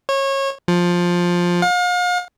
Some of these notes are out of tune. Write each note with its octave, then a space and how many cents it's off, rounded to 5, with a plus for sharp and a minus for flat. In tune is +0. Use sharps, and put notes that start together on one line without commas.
C#5 -25
F3 +10
F5 +40